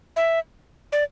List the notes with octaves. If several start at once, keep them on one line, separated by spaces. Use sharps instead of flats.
E5
D5